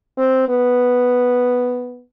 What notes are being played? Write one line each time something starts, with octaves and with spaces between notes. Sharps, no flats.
C4
B3